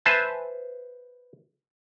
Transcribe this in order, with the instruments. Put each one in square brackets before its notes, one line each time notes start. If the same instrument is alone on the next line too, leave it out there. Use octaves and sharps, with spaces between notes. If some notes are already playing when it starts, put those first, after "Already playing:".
[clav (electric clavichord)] B4 C5 E5 G#5 A5